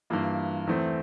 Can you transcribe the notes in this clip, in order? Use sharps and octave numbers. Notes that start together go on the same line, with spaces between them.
G2 E3 A#3 F4
E2 E3 A3 C4